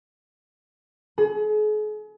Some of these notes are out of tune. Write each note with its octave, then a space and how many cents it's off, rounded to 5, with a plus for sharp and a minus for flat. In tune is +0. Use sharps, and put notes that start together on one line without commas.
G#4 +40